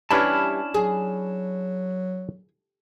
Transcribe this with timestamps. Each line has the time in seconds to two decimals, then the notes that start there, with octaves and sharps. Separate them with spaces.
0.11 E3 G3 C#4 D4 E4 A5 B5 F6
0.74 F#3 G#4